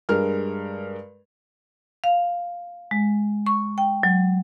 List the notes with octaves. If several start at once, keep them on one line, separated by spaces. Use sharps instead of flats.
G2 G#3 A#4 F6
F5
G#3
C#6
G5
F#3